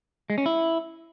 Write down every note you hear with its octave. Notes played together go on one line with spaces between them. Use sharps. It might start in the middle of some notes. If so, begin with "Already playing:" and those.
G#3
C#4
E4